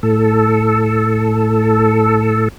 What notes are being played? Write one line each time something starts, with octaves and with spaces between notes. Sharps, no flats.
A2 A4